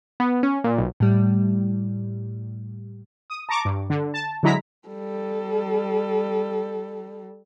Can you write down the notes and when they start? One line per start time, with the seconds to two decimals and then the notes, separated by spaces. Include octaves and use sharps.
0.20 B3
0.43 C#4
0.64 A#2
0.78 B1
1.00 A2 G3
3.30 D#6
3.49 A5 A#5 C#6 D6
3.65 G2
3.90 D3
4.14 A5
4.43 D3 F#3 G#3 E4 A#5 B6
4.88 G3 A4